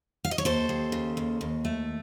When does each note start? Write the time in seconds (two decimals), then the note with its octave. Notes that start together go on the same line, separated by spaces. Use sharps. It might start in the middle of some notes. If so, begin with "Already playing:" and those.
0.25 F5
0.31 D#5
0.38 C#5
0.45 D#2 A4 C5
0.69 D#2
0.92 C#3
1.17 D#2
1.41 D#2
1.65 A3